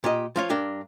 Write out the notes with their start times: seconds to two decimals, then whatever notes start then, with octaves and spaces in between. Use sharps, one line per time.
0.04 A#2 G4 D#5
0.36 F3 F4 C#5
0.50 G2 D4 A#4 G5